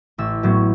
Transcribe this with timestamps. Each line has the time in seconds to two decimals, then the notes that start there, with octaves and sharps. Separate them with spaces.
0.18 A1 E6
0.43 A2 F#3 B3